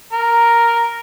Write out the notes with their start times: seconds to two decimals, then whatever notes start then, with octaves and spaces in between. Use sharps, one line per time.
0.13 A#4